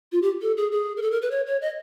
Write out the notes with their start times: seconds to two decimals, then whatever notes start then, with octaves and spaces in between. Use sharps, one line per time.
0.12 F4
0.22 G4
0.42 A4
0.57 G#4
0.72 G#4
0.97 A#4
1.02 A4
1.11 A#4
1.22 B4
1.31 C#5
1.46 C#5
1.62 D#5